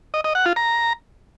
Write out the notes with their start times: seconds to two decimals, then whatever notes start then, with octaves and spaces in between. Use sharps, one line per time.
0.14 D#5
0.24 D#5
0.35 F#5
0.46 F4
0.56 A#5